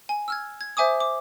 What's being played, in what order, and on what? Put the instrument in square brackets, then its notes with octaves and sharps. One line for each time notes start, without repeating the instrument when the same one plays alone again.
[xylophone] G#5
E6 F6 G#6
G#6
C5 E5 G#5 D6 D#6
D6